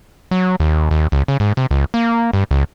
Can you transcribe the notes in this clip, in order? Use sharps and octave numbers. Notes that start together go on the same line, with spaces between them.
F#3
D#2
D#2
C#2
C#3
G#2
C3
C#2
A#3
G2
C#2